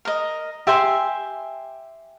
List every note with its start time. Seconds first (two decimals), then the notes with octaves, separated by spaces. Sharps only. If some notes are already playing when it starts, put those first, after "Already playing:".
0.05 A#4 D#5
0.67 G4 E5 G#5 C6